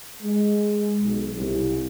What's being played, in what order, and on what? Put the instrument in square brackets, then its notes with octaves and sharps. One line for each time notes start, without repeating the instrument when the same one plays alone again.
[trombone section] G#3
B1
C2